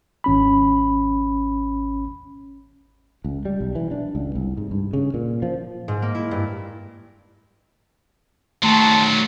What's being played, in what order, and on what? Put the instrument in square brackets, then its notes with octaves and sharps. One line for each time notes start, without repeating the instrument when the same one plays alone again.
[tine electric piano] G#1 C#4 B5
[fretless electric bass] C#2
G3
B1
E3
D4
C#2
C2
G#2
G2
C#3
A#2
F3
[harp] G#2
A#3
E4
G2
[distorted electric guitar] D#3 F#3 [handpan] A3 [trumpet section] A5 C6